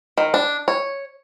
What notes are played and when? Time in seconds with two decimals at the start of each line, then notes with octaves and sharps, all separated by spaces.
0.18 D#3
0.34 D4
0.68 C#5